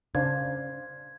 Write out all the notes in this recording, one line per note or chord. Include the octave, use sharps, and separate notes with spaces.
C#3 D4 C5 F5 G#6